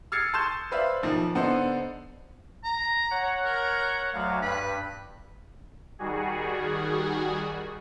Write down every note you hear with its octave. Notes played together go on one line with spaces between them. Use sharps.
E6 F6 G#6 A6 C7 C#7
A5 C6 C#6 G6 A6 E7
B4 C5 D5 E5 F5
B1 D#3 F3
D3 B3 D4 D#4 A4 C5
A#5
C#5 F#5
A#4
D2 F#3 F5
G2 B4
D#3 G3 F#4 G#4